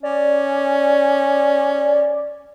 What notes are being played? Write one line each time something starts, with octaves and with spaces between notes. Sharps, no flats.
C#4 D5